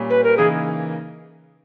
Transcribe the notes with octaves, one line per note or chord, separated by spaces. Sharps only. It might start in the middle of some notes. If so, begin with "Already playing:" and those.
Already playing: A#2 G3 C#4
B4
A#4
C#3 E3 A#3 D#4 G#4